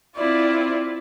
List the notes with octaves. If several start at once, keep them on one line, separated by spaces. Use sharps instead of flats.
C4 E4 F4 D5